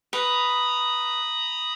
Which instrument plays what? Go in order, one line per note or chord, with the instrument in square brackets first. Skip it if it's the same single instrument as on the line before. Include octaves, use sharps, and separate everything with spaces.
[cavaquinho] B4 [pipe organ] A#5 B5 D#6